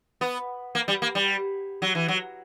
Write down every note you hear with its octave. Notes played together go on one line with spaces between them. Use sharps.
B3
A#3
G3
A#3
G3
F#3
E3
F#3